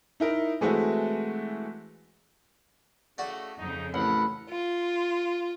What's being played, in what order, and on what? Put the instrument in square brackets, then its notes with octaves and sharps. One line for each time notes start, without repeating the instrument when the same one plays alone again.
[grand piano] D#4 E4 A#4
E3 G#3 A3 C4 E4 F#4
[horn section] A2 C#3 A3 [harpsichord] F#4 D5
[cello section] F2 C#3 [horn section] D#4
[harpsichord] A1 [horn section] A4 A#4 F#5 [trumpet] B5
[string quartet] F4